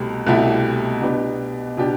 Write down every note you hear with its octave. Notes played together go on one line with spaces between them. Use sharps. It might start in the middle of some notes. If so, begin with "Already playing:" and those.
Already playing: C2 B2 A3 G4
C2 B2 A3 E4 G4
B2 B3 D4 G4
B2 B3 D4 G4